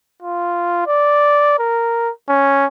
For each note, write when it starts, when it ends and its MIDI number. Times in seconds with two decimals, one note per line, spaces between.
0.22 0.86 65
0.87 1.59 74
1.59 2.10 70
2.29 2.66 61